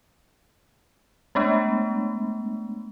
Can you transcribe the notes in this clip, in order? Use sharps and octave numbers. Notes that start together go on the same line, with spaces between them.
G#3 A3 B3 D4